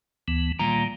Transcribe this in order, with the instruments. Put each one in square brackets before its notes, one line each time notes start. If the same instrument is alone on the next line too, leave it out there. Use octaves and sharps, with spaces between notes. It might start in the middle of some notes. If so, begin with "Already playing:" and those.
[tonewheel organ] D2 E3 B3
[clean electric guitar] A#2 A#5 [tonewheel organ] D#3 G3